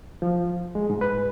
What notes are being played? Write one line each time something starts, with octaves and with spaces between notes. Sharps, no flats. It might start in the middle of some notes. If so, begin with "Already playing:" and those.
F3
G#3
G#2
B4